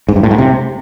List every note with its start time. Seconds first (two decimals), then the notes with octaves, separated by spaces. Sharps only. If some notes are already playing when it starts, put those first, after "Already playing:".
0.08 G#2
0.16 G2
0.23 A2
0.31 G#2
0.38 C3